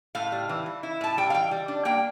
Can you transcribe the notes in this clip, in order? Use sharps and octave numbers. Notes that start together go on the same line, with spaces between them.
A2 F5
G3
E3
E3
E4
A2 A5
G3 G5
F5
E3 G5
G3
D4
A#3 G5